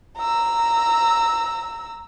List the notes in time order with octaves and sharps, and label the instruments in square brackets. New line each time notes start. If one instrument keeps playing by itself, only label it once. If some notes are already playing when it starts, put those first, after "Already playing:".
[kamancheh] A#5 E6